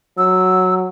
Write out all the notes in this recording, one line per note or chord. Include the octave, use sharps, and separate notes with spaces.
F#3 E6